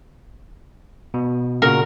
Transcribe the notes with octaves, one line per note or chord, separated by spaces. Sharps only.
B2
A#2 C#3 F#4 A#4